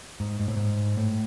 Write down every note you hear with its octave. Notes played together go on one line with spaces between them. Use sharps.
G#2
G#2
A2
G#2
A2